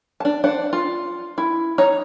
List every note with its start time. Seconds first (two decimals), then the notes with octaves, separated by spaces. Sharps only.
0.20 D4 A5
0.44 D4 C5 F#5
0.73 F4
1.38 E4
1.78 D#4 C#5 A#5